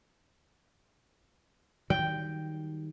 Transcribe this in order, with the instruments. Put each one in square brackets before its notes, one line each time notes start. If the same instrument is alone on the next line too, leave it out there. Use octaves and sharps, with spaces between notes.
[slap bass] D#3 F#3 G3 [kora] G5